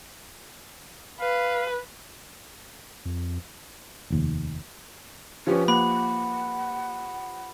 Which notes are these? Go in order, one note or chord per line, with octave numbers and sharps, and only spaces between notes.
B4 F5
F2
F1 D#2
F3 C#4 G4 B4
A#3 F#5 B5